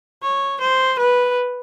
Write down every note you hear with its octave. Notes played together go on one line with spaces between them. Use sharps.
C#5
C5
B4